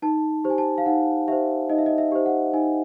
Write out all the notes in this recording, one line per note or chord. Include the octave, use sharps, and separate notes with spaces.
D#4 A5
G4 C5
G#5
A5
F5
D#4 F#5
G4 C5 E5
D#4 D#5
E5
D#5
E5
G4 C5
F#5
D#4 G#5